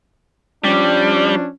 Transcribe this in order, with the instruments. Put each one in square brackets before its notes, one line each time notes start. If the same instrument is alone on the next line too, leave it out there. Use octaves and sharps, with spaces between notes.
[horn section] F3 C#4 D4 [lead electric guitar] G3